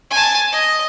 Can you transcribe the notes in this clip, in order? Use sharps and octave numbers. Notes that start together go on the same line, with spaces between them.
G#5 A5
D#5